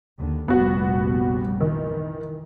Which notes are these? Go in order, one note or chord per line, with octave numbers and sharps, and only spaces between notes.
D#2 D3
F1 A#1 G3 B3 F#4
D#3 E3